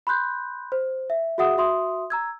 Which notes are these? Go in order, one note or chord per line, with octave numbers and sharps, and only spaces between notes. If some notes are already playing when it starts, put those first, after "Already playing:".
B5 C6 F#6 G6
C5
E5
F#4 G#4 E5 F#5 D#6
F#4 E5 C6 D#6
A#5 E6 G#6